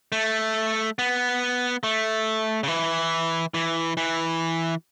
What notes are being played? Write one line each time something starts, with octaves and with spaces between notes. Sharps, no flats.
A3
B3
A3
C#3
E3
E3
E3